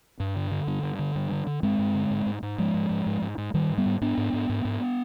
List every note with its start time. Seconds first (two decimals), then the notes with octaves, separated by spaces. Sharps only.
0.20 G2
0.36 D3
0.51 D3
0.67 G2
0.83 G2
0.99 D3
1.15 G2
1.31 D3
1.47 D3
1.63 G2 G#3 C4
1.79 G2
1.94 D3
2.11 G#2
2.26 G#2
2.42 G#2
2.58 G#2 F3 G#3
2.74 G#2
2.90 G#2
3.06 G#2
3.22 G#2
3.38 G#2
3.54 G#2 D#3 G3
3.70 G#2
3.78 G3 B3
3.86 G#2
4.01 G#2 B3 D4
4.18 G#2
4.33 G#2
4.49 G#2
4.65 G#2